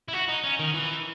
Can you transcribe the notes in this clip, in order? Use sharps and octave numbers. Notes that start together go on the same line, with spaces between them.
E4
F#4
D#4
C#4
D#3
E3